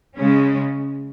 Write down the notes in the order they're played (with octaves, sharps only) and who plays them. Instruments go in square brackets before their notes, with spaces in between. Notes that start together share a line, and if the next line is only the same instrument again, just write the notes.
[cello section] C#3 G#3 C#4